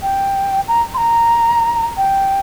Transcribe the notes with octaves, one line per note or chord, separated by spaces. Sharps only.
G5
A#5
C6
A#5
G5